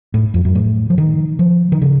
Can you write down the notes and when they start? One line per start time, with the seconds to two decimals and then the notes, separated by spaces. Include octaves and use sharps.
0.14 A2
0.34 F2
0.45 F#2
0.55 A2
0.90 F3
0.98 D#3
1.39 F3
1.72 D#3
1.82 C#3